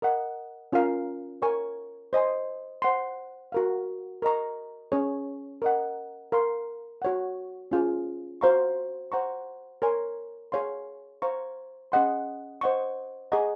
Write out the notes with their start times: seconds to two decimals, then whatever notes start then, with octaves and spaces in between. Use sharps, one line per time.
0.02 A#4 D#5 F#5
0.72 C#4 F4 A#4 F5 A#5
1.42 A#4 C#5 G#5 C#6
2.13 C5 D#5 G#5 C6
2.82 C5 F#5 C6
3.52 F#4 A#4 F5
4.22 A#4 D#5 A#5 C#6
4.92 C#4 G#4 C#5
5.62 A#4 D#5 F#5
6.32 A#4 F5 C6
7.02 F#4 C#5 F#5
7.71 C#4 F4 G#4
8.41 F#4 C5 F5 A#5 C#6
9.12 C5 F#5 A#5 C#6
9.82 A#4 C#5 G#5 C6
10.52 G#4 C#5 F5 C6
11.22 C5 F5 A#5 C#6
11.92 C#4 G#4 D#5 F#5 C6
12.61 C5 D#5 F#5 C#6
13.32 G#4 D#5 F#5 A#5 C#6